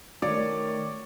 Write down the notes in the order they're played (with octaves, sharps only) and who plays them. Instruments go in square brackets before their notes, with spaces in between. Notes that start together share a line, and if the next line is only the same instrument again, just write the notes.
[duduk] D#3 [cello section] A3 [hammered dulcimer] C#5 [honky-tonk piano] D5